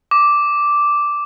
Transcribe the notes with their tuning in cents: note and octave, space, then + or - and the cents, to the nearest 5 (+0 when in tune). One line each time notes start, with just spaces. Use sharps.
D6 -5